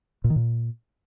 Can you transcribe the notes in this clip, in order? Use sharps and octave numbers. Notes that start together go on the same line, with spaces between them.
A#2
D#3
A#2